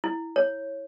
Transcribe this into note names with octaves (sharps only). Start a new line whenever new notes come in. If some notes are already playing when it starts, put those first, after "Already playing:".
E4
C#5